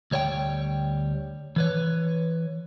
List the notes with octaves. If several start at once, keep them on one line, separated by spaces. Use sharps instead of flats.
D2 G3 C#5 E5 G5
E3 B4 C#5